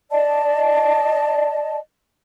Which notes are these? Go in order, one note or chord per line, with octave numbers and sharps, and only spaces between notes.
D5 D#5 A5